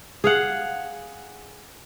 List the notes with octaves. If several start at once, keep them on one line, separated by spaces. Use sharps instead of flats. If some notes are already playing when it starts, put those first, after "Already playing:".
G#4 F5 F#5